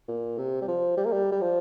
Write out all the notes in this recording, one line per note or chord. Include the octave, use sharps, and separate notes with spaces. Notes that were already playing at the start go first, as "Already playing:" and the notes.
A#2
C3
G3
F3
G3
A#3
G3
G3
F3